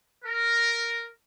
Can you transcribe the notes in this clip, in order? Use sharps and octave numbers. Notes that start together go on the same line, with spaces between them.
A#4